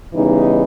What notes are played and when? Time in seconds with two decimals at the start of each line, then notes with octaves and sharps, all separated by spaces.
0.13 C#3 E3 G3 B3 D#4